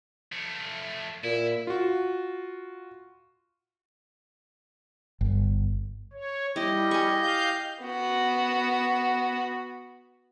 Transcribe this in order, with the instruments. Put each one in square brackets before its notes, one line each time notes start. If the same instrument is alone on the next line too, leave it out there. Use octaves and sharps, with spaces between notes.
[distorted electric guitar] F3 A3
[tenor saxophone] A#2 [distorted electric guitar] E4
[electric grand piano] F4 F#4
[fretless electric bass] G1
[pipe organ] C#5
[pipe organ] G3 [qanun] E4 [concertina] G4 D#5
[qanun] G#5 C#6
[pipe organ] F5 G6
[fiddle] B3 F#4